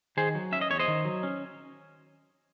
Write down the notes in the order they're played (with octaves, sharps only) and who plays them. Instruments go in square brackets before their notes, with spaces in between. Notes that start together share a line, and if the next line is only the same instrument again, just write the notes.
[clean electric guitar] D#3 G#4 C5
F#3
C#4 E5
D#5
E2 C#5
C5 D#5
D#3
F#3
C#4